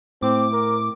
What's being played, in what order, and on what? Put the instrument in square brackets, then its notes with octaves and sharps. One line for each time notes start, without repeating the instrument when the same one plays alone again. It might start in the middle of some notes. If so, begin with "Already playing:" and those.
[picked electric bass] A2 [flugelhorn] C4 [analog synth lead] D6
[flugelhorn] A#4